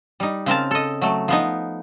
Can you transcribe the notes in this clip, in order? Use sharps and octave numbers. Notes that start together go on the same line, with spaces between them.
G3 D#4
C#3 C4 A#4 A5
A4 D#5
F#3 A3
F3 B3 D#4